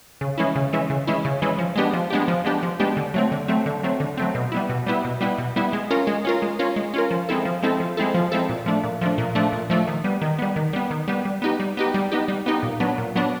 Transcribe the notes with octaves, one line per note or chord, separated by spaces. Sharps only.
C#3
E3 G#3 C#4 E4
C#3
E3 G#3 C#4 E4
C#3
E3 G#3 C#4 E4
C#3
E3 G#3 C#4 E4
F3
G#3 B3 D4 G4
F3
G#3 B3 D4 G4
F3
G#3 B3 D4 G4
F3
G#3 B3 D4 G4
D3
F#3 A3 C4
D3
F#3 A3 C4
D3
F#3 A3 C4
D3
F#3 A3 C4
B2
G3 B3 E4
B2
G3 B3 E4
B2
G3 B3 E4
B2
G3 B3 E4
G#3
C#4 F4 A#4
G#3
C#4 F4 A#4
G#3
C#4 F4 A#4
G#3
C#4 F4 A#4
F3
G#3 C4 E4 A4
F3
G#3 C4 E4 A4
F3
G#3 C4 E4 A4
F3
G#3 C4 E4 A4
A#2
F3 A3 D4
A#2
F3 A3 D4
A#2
F3 A3 D4
A#2
F3 A3 D4
D#3
G3 B3
D#3
G3 B3
D#3
G3 B3
D#3
G3 B3
G3
B3 D#4 G4
G3
B3 D#4 G4
G3
B3 D#4 G4
G3
B3 D#4 G4
A#2
F#3 B3 D4
A#2
F#3 B3 D4